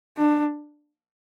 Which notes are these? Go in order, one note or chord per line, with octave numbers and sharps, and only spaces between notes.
D4